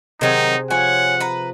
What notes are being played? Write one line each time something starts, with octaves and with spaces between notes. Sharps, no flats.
C3 D#3 F#3 C4 D#4 G#4
F3 C#5 F#5 G#5
B4 A#5